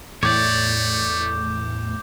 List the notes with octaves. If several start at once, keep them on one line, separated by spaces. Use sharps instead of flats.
E2 A2 A3 C#5 D5 D6 G6